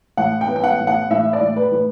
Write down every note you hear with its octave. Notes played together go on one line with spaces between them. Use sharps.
A2 F#5
G5
B3
G5
F#5
A2
F#5
A2 E5
D5
A2
B4
A2 B4